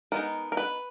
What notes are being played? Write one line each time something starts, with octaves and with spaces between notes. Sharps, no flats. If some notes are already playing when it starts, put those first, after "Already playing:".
G#3 B3 D#4 A#4
A#4
B4